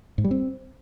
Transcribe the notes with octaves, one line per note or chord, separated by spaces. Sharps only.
G#2
G3
C4